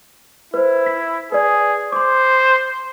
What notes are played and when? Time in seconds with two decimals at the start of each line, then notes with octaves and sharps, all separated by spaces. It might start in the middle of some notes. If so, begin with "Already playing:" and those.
0.54 E4 B4 C5
0.86 B6
1.32 G#4 B4 D5
1.92 C5 C6 D6